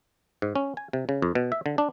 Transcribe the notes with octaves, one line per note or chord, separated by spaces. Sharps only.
G#2
C#4
G#5
C3
C#3
F2
B2
E5
D3
D4